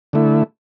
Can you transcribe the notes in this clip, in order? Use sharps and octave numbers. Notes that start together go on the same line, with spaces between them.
D3 A3 E4